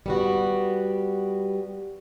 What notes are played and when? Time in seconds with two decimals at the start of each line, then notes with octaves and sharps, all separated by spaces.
0.06 G3 B3 F#4